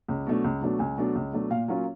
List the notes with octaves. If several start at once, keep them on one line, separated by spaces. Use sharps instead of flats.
C#2
B2 F#3 A3 D4
C#2
B2 F#3 A3 D4
C#2 G#5
B2 F#3 A3 D4
C#2
B2 F#3 A3 D4
A#2 F5
F#3 A#3 C#4 F4